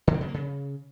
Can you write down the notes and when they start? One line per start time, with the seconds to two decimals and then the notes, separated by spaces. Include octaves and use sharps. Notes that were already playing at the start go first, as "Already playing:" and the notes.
0.07 D3
0.14 C4
0.21 C#3
0.28 A#3
0.34 C#3